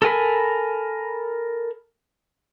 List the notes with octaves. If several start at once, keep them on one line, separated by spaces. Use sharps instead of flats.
A4 A#4 G#5 B5